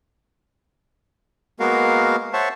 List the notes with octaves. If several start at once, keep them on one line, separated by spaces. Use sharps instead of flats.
G#3 A#3 B3 F#4 A#4 F5
C5 C#5 E5 F#5 A5 C#6